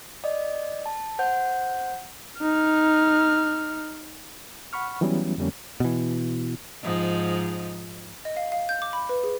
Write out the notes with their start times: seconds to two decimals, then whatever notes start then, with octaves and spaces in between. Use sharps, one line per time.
0.24 D5 D#5
0.86 A5
1.19 C5 F#5 G6
2.41 D#4 F6
4.73 F#5 B5 C#6 F6
5.01 E3 F#3 G3 B3 C#4 E4
5.38 F2 D3 G3 A#3 C#4
5.80 B2 E3
6.83 G#2 F3 D#4
8.25 D#5
8.36 F5
8.52 F5
8.69 G6
8.82 D6
8.93 B5
9.09 B4
9.23 G#4